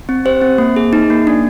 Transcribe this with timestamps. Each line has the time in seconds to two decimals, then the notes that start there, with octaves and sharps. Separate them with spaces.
0.09 C4
0.25 G4 C5
0.41 C4
0.58 A#3
0.76 G#4
0.93 D#4
1.10 A#3
1.27 D4